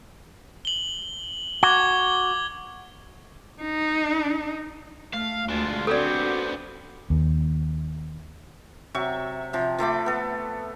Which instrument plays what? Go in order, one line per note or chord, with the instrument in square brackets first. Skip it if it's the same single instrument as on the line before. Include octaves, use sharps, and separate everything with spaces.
[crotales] F#7 G7
[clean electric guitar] F#4 [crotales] D6 G#6 G7
[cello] D#4
[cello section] A3 [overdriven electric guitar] F5
[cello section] D2 [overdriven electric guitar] G#3 D4 [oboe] F4
[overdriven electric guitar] B3 C4 [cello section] D4 F#4 [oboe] G4 [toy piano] A4 D5
[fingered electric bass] D#2
[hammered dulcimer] C3 F#3 E5 C#6
C3 F3
F3 A3 B5 D6
B3 A4